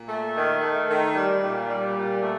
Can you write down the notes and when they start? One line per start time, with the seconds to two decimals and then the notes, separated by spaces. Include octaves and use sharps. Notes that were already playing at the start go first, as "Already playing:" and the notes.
Already playing: A#2
0.08 A3
0.35 D#3
0.63 A3
0.89 D#3
1.16 G3
1.43 A#2
1.69 G3
1.96 A#2
2.23 A3